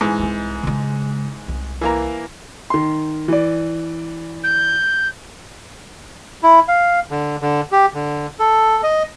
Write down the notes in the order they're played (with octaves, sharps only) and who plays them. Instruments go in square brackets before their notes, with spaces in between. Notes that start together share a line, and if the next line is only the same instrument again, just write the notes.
[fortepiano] G#2 E3
[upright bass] C2 G#3
C#3 G#3
C2
[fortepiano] E3 A#3 A#5
[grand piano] D#3 C6
E3 D5
[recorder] G6
[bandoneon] E4
F5
D3
D3
G4
D3
A4
D#5